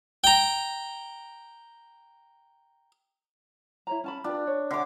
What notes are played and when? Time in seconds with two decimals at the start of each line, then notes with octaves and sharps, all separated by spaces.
0.24 G5 A#5
3.87 E4 C#5 A#5
4.04 C#4 A5 B5
4.24 D4 F4 G4 B4
4.47 C#5
4.71 D3 C#5 E5 F#5 D6